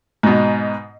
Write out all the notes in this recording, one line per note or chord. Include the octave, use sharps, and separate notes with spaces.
G#2 B2